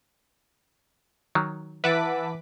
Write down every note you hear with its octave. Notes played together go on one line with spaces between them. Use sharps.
D#3 F#3
E3 B4 E5 F#5 A5 D6 B6